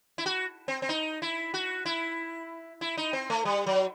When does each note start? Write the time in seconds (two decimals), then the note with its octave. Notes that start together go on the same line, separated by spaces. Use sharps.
0.18 E4
0.26 F#4
0.68 C4
0.82 C4
0.89 D#4
1.22 E4
1.54 F#4
1.86 E4
2.81 E4
2.97 D#4
3.13 C4
3.30 A3
3.45 G3
3.66 F#3